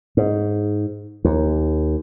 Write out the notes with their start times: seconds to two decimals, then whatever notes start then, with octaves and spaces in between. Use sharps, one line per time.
0.17 G#2
1.25 D#2